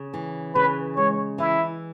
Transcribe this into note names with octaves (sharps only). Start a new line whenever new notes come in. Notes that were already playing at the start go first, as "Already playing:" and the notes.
Already playing: C#3
E3
C#3 B4
G#3 C#5
E3 E4